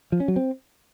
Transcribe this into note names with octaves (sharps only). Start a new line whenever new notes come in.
F3
C#4
F#3
C4